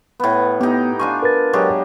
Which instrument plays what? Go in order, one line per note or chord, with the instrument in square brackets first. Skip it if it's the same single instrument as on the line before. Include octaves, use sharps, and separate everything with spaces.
[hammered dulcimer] A2 B3
[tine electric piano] B3 [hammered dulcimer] D#4 G4
[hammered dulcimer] D4 F4 G#5 [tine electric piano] C#6
[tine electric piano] A#4 B4 A6
[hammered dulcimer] F#3 G#3 G4